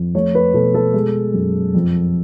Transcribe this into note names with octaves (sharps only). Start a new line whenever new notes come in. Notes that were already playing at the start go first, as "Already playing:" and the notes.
Already playing: F2
A3 C#5
B4
B2 A4
A4
G#3
F#2
F2